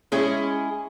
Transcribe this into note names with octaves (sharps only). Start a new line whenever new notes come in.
G#3 C#4 E4 G#4